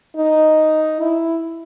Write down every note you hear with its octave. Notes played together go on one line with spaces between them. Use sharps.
D#4
E4